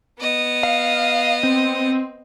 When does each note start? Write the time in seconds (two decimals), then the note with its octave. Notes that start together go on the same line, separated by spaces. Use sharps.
0.19 B3 D#5
0.63 F5
1.43 C4